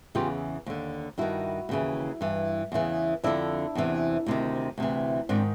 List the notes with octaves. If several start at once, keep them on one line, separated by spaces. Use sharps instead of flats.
E2 C#3 E3 F4 G4
D#2 D3
G2 D#3 E4 F#4
D#2 C#3 E3
G2 E3
E2 C#3 E3
F2 D3 D4 E4
E2 C3 E3
D2 C3 D#3
D2 C3 E3
G#2 D#3 C4 D4